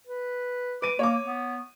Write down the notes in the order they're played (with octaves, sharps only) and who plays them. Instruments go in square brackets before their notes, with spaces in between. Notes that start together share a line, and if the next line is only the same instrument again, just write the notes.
[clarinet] B4
[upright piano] B4 D#7 [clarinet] D6
[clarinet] A#3 [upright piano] C#5 D6
[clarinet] B3